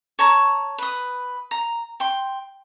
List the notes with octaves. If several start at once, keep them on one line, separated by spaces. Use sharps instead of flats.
C#5 A5 A#5 C#6
B4 D#6
A#5
G5 C6